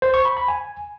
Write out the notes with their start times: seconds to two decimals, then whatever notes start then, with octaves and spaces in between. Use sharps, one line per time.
0.02 C5
0.14 C#6
0.25 B5
0.37 B5
0.48 G#5